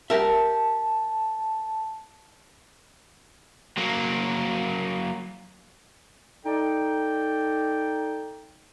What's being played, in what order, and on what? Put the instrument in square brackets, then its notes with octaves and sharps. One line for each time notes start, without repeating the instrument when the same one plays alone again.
[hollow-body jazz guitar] G4 A#4 E5 [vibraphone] A5
[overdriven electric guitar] F#3 A#3
[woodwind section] D#4 A4 D5 G5